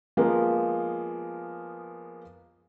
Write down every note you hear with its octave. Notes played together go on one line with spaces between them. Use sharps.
F3 G#3 A#3 B3